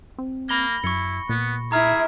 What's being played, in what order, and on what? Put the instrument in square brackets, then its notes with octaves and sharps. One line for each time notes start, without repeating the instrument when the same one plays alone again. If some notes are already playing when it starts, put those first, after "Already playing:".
[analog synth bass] C4
[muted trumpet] A#3 [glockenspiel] B5 A#6 G7
[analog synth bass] F#2 [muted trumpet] E4 [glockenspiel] C#6 C#7
[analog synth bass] A#2 [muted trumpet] B3
[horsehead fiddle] E4 E5 [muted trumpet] G#4 [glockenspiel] A#5 F6